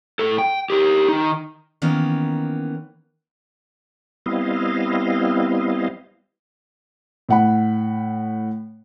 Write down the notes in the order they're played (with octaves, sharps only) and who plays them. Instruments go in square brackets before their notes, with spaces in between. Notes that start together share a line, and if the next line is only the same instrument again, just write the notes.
[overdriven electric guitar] A2 A4
G5
G4 A#4
D#3 D#4
[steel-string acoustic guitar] D#3 E3 A#3 B3 C#4
[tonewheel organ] G3 B3 C4 E4 D#5 F5
[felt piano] A2 F#5 B5